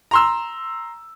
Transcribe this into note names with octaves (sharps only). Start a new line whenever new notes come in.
A#5 C6 E6